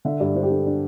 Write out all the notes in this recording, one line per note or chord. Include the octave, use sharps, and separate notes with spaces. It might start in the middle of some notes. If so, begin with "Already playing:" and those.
D3 E5
G2 D5
D4 C5
G4
D4 A4
D4